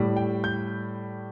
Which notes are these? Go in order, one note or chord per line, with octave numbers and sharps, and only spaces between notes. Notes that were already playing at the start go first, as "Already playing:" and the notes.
Already playing: A2 G3
G5
G6